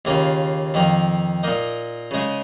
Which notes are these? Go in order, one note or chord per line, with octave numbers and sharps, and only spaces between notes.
D#2 C#3 A#3 F4
F2 D#3 A#3
A#2 A#3 D#4
C#3 G#3 D#4